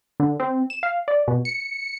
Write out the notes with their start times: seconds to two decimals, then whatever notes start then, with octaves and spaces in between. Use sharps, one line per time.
0.20 D3
0.40 C4
0.70 E7
0.83 F5
1.08 D5
1.28 B2
1.45 C#7